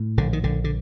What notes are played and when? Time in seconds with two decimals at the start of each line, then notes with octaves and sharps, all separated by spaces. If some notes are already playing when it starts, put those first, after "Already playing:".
Already playing: A2
0.17 A#1 D3
0.33 D#3
0.44 A#1 D3
0.64 D3